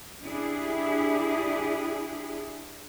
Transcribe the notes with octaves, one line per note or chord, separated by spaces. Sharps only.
D4 E4 G4 G#4